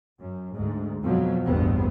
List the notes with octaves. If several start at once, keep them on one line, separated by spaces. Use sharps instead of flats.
F#2
D2 G#2
F2 B2 F3 F#3
A1 E2 G2 B3 C4